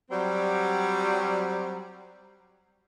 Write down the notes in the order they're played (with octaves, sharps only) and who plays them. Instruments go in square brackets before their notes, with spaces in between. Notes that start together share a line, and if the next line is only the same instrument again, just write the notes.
[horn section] F#3 G3 C4